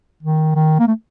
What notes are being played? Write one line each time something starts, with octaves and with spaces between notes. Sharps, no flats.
D#3
D#3
A#3
A3